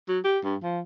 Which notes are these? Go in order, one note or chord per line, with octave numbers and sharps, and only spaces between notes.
F#3
G4
G2
F3